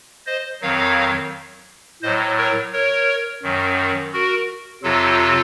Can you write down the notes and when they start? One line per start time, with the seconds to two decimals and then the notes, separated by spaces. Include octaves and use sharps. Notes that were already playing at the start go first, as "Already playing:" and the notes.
0.26 C5 D#5
0.62 F2 D#3 F#3 C#5 F5
2.03 A2 F#3 C5 D#5
2.37 A#4 C#5
2.73 A#4 C#5
3.43 F#2 D#3 F#3
4.13 F#4 A#4
4.83 F2 C3 F#3 F4 A4